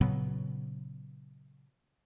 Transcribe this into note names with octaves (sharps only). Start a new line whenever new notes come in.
A#2 C#3 F#3 B3